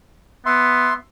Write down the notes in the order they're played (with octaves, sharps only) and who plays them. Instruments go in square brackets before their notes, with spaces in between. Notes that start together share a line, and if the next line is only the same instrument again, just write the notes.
[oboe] B3 [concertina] E5 C6